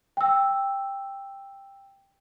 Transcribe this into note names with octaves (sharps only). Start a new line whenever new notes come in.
G5 E6